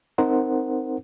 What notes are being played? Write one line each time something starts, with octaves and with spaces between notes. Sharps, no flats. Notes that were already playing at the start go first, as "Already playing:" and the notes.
C4 D#4 A#4 C5 F#5